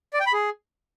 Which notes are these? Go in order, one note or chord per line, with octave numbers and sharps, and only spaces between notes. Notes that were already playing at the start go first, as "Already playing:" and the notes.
D5
G5
B5
G#4